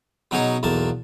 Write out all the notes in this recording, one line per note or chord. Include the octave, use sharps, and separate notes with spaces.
B2 F#3 C#4 D#4 G#4 C#5
B1 E2 A#3 A5